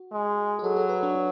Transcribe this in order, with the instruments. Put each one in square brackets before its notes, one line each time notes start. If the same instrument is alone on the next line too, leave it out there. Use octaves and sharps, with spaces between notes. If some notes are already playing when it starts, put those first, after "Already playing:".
Already playing: [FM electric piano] F#4
[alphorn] G#3
[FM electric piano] G#4
[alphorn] F#3 [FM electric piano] A4
[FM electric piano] A4
B4
D4
D4